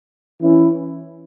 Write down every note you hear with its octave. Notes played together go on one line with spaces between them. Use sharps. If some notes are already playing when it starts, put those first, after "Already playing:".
E3 C#4 E4